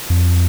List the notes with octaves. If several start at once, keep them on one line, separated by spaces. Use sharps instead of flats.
F2